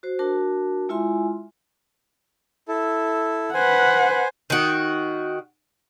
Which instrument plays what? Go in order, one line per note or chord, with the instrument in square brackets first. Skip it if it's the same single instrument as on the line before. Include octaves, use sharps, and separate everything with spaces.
[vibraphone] F#4 C5
D4 F#4 A#4 A5
G#3 E4 F4 E5 G#5 C6
[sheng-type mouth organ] E4 A4
[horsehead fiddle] B4 F#5 [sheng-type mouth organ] C5 G#5
[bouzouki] D#3 F#4